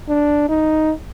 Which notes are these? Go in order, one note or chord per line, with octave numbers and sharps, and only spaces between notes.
D4
D#4